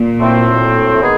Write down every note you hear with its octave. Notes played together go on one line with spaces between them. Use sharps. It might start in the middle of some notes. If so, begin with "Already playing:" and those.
Already playing: A#2
A2 F#3 A3 C4
D#3 G#3 B3 D#4 G#4